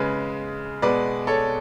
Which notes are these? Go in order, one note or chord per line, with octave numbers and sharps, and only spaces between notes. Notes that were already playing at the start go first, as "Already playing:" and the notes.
Already playing: C#3 G#3 B4
B2 G#3 B4 D5
A4 C#5